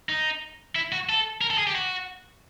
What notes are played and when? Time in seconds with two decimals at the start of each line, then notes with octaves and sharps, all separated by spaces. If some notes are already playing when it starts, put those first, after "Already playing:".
0.09 D#4
0.76 E4
0.92 F#4
1.09 A4
1.41 A#4
1.50 A4
1.58 G#4
1.67 G4
1.75 F#4